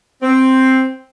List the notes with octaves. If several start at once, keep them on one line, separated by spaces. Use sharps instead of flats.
C4